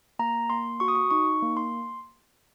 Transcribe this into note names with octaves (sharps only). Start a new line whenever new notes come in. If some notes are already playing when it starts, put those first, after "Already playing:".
A#3 A#5
A#3 C6
F#4 C#6
D#6
C#6
D#4 C#6
A#3
C6